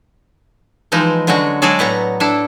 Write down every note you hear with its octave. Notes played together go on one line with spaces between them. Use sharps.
E3 F3 G#3 D#4
D3 F#3 G#3 C#4 F#4
F#3 G#3 F#4 G#4 A4 D5
A2 B3 F#5 A#5
D4 E4 A4